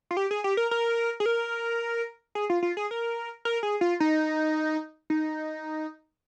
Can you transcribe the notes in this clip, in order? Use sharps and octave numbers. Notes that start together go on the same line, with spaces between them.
F4
G4
G#4
G4
A#4
A#4
G#4
A#4
G#4
F4
F4
G#4
A#4
A#4
G#4
F4
D#4
D#4